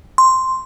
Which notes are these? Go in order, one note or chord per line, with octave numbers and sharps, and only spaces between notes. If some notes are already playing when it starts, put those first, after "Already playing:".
C6